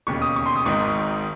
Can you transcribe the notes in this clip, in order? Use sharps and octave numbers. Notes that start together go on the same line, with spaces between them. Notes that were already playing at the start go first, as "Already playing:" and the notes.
E1 D#2 C#3 C#6
D#6
C#6
C6
D#6
G#1 G#2 D#3 C#6